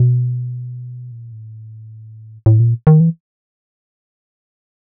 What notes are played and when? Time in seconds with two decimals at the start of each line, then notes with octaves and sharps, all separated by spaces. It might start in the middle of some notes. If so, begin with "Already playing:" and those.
Already playing: B2
1.12 A#2
1.32 A2
2.46 A2
2.60 A#2
2.87 D#3
3.00 E3